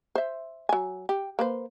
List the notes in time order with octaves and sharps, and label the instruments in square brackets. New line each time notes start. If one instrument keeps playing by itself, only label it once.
[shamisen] C5 E5
F#3 G#5
G4
A#3 B4 C5